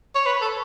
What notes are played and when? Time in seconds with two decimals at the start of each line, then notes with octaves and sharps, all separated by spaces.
0.15 C#5
0.26 B4
0.42 A4